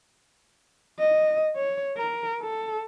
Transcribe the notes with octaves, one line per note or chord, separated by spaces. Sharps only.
D#5
C#5
A#4
A4